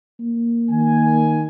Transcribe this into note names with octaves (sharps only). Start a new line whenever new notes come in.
A#3
D#3 G#5